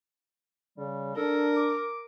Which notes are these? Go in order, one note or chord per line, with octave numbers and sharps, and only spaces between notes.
C#3 G3
D4 A4 A#4
D6